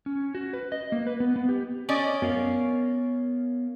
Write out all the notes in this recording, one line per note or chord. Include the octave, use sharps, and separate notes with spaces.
C#4
F#4
B4
D#5
A#3
B4
B3
B3
G4
C#4 D5 D#5
F#2 B3 A#4 F5